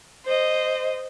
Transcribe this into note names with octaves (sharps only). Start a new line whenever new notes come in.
C5 D#5